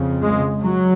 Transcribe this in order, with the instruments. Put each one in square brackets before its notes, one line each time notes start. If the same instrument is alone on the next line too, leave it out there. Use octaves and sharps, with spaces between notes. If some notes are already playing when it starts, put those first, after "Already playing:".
Already playing: [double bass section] F2 C#3
G#3
F#3